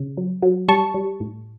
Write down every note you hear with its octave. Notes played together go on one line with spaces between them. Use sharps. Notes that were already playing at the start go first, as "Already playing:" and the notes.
Already playing: C#3
F#3
F#3
G3 A5 C#6
G3
A2